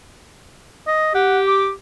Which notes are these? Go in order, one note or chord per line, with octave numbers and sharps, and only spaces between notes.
D#5
G4 F#5
D6